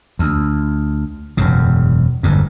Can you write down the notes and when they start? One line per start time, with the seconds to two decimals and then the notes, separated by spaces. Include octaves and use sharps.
0.19 D2
1.37 E1 F#2 C#3
2.23 G1 F2 G#2